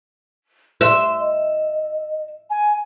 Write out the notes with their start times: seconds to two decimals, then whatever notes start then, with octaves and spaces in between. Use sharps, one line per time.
0.81 E5 C6
1.20 D#5
2.50 G#5